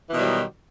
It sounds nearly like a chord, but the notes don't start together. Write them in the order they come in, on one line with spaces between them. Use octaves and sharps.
E3 B2 D#3 F#3 G3